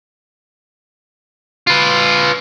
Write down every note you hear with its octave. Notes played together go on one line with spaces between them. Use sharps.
F4 B4